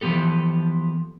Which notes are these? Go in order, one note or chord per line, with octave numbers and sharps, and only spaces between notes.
E3 F3 B3 G4 A4